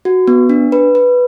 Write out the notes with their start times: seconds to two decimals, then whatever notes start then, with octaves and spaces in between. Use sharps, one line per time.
0.05 F#4
0.28 B3
0.49 D4
0.72 B4
0.95 B4